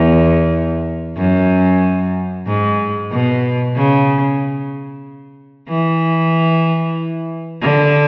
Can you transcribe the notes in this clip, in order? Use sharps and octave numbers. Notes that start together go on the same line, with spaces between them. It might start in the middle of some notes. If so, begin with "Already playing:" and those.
Already playing: E2
F#2
G#2
B2
C#3
E3
D3